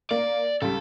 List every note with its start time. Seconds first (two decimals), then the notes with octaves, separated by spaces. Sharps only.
0.11 A#3 D5
0.62 C#2 G3 A4